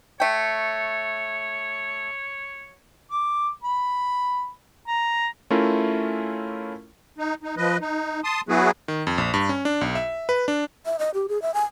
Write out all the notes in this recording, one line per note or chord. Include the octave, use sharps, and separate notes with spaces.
A3 C#5 G5
D6
B5
A#5
A3 C#4 E4 F4 A#4
D#4
D#4
F3 B4 D#5
D#4
A5 C6 D#6
F#3 B3 E4 F#4 G#4 B4
D#3
F2
A#1
G2
C#4
D4
B1
E5
B4
D4
E5
D#5
G4
G#4
E5
G#5